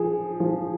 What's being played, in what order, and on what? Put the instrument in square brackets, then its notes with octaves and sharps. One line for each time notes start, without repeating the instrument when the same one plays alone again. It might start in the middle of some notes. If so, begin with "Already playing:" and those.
Already playing: [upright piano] F3 G#4
F3